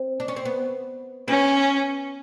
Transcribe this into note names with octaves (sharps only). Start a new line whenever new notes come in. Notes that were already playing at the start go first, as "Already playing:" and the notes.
Already playing: C4
D4
C#4
C4
B3
B3 C#4